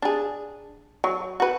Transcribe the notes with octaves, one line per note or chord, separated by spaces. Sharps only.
D4 G#4
F#3
F#4 B4